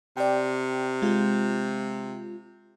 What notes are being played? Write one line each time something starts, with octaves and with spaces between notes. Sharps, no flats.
C3 D5 G5
G#3 F4